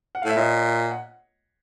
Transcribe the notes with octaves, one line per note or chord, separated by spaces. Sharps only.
F#5
F5
A2 E5
A#2 C#5 D#5
F#5